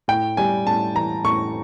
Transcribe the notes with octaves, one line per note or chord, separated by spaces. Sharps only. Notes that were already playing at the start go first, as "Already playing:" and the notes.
A2 G5
G3 G#5
A2 A5
E3 A#5
A2 C#6